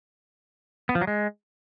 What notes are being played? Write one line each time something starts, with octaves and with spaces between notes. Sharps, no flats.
B3
F3
F#3
G#3